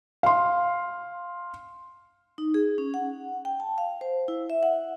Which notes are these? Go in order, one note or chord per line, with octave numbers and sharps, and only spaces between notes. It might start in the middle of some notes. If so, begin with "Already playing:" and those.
F5 C6
D#4
G#4
C#4
F#5
G5
A5
F5
C5
E4
E5
F#5